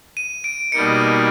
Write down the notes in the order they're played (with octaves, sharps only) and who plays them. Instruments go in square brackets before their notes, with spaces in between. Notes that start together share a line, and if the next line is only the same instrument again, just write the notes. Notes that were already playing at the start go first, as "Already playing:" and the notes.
[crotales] D#7
D7
[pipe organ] B2 G3 A#3 D#4 [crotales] C#7